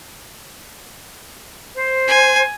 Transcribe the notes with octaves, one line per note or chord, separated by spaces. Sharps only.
C5
G#5